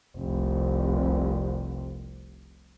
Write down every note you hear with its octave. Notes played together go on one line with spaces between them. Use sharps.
F1 C2